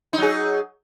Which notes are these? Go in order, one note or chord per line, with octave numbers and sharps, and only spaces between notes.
F#3 D#4 G#4